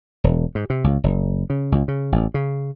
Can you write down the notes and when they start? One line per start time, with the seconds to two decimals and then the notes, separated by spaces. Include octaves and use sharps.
0.24 E1
0.55 G#2
0.70 C3
0.84 C#2
1.04 F#1
1.50 C#3
1.72 C#2
1.88 C#3
2.12 A1
2.34 C#3